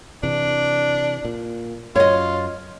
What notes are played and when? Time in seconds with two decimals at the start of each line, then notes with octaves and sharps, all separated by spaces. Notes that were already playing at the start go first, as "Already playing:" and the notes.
0.23 C3 E3 D4
1.25 A#2
1.96 F#2 F4 C#5 D#5